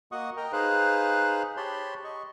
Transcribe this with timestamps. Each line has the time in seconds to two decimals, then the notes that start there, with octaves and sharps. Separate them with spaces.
0.12 A#3 F#4 D#5 F#5 C#6 D#6
0.37 A#4 D#5 G5 A#5
0.53 D#4 G#4 B4 C5 F5 F#6
1.57 G4 C#5 A5 B5 C6
2.04 D#5 C#6